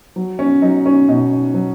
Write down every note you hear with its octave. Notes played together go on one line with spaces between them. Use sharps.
F#3
C#4
F#3 D#4
C#4
B2 D#4
F#3